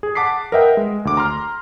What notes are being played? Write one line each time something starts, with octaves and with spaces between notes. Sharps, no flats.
G#4
F#5 A5 D6 B6 C7
A#4 B4 D#5 E5 F#5 G5
G#3
D2 D6
A#5 C6 F6